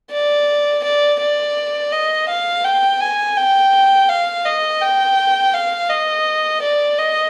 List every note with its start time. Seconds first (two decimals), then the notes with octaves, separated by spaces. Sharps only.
0.11 D5
0.83 D5
1.20 D5
1.92 D#5
2.29 F5
2.64 G5
3.01 G#5
3.37 G5
4.09 F5
4.46 D#5
4.82 G5
5.54 F5
5.90 D#5
6.62 D5
6.98 D#5